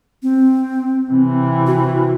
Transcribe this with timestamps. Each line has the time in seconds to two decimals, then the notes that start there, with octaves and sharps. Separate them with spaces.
0.23 C4
1.08 C3 E3
1.67 F#4